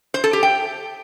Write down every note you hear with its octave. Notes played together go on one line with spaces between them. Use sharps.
C5
A4
G4
G5